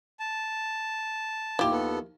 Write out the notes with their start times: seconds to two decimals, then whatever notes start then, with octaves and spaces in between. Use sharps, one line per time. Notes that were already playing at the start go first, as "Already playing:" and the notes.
0.19 A5
1.59 D#2 F3 E4 G4
1.71 B3 A4